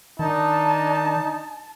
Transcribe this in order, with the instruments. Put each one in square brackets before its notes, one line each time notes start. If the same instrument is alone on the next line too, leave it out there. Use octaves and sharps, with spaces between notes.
[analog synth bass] D#3 [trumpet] D4 [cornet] D#4 [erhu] A5